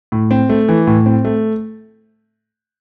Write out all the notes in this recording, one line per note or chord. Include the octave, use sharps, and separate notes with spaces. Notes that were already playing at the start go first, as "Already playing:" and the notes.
A2
C4
A3
E3
A2
C4
A3